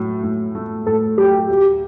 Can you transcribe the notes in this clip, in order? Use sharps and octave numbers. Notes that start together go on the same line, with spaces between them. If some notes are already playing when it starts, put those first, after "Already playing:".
Already playing: A2 F#3 A3
A2
A3
A2 A4
F#3 G4
D2